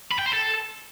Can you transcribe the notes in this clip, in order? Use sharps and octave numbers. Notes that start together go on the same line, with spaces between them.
B5
G5
C5
A4